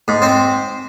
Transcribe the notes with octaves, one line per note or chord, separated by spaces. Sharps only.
G#2
C4